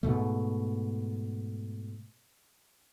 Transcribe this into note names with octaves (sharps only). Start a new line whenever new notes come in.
G#2 B2 A3